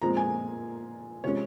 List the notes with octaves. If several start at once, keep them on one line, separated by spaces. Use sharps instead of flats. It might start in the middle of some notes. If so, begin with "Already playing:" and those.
A#2 F3 G#3 C4 A#5
G#5
C3 F3 G#3 C#4 C#5